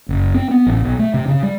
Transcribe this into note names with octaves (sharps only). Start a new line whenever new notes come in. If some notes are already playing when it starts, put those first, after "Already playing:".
F#1
C4
B3
A1
B1
A3
C3
C#3
G3